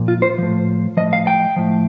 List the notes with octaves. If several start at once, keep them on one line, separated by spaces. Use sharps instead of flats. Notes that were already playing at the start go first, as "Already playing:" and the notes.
Already playing: A#2 F3
F4
C5
A2 F3
A2 F3 D#5
F5
G5
A2 F3